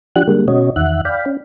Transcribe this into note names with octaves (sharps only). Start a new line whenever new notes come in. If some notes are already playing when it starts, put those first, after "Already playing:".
F3 D4 G4 F#5 F#6
D3 G3 G#3 A#3
B2 C#4 F#4 C#5 D#5
E2 D#3 E5 F#5 F#6
D5 F5 G5 B5
C#4